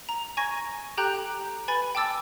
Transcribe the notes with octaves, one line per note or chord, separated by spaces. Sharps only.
A#5
G#5 C#6 G#6 A#6
G4 A4 G5 A#5 F#6 G6
B4 G#5 B5 A6
G5 A5 D6 E6 A6